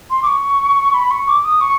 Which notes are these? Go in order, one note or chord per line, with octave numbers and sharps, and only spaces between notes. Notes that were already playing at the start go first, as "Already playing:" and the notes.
C6
D6
C#6
B5
C#6
D6
D#6
C#6